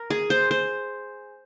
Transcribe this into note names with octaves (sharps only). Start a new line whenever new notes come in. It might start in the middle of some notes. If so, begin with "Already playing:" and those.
Already playing: A#4
G#4
C5
C5